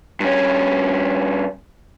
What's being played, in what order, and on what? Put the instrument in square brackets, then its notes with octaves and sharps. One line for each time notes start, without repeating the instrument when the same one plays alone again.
[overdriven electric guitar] G2 C#4